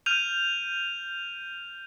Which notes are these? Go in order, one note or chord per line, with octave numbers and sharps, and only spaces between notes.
F6 G6 D#7 F7